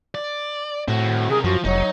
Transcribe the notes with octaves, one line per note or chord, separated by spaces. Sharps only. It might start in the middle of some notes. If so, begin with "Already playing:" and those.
D5
A2 C4 F#4
C3 G#4 A#4
F#2 F3 F#4
F1 F#3 D#4